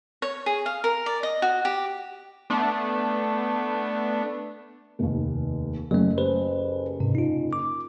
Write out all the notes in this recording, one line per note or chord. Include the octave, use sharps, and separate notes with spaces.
C#5
G#4
F5
A#4
D5
D#5
F#4
G4
A3 B3 D4
F1 D#2
F#1 F#3 A3
G4 B4 C5
G#2 C3
D#4 F4
D6